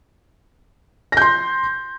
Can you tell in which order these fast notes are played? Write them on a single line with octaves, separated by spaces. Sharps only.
A#6 G6 C6